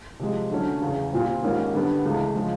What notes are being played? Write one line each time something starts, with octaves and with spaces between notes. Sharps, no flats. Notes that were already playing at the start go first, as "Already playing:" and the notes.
C3 F3 G#3
D3 F#3 A3 C#4
E2 C#3 E3
A#2 G3 C4
G#2 D#3 G3 A#3 C#4
D3 G3 B3
C#2 C#3 E3 A3
C#3 F3 G#3